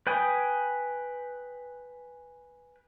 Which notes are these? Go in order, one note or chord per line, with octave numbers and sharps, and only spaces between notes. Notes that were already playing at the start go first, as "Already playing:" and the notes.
B4 G5 G#5 D#6